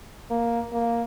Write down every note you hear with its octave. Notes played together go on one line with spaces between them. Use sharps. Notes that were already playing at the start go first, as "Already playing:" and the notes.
A#3
A#3